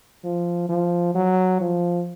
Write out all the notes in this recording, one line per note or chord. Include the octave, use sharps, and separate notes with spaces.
F3
F3
F#3
F3